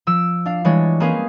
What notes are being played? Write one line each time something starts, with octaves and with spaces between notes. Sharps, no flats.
F3 E6 D7
D4 F5
E3 G3 G#3 D4 C#5
A#3 C4 C#4 G#4 B4 F5